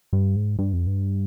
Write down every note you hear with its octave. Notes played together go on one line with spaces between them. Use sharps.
G2
G#2
G2
F2
G2